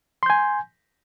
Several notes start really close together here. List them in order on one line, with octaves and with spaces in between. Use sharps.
C6 G6 G#5